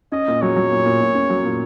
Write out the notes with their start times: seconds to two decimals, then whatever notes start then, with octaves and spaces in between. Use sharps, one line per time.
0.12 C#4 D#5
0.28 A#2
0.42 F#3 C#5
0.56 F#3
0.72 A#2
0.85 A#2
1.00 A#2
1.15 C#4
1.30 F#3
1.44 A#2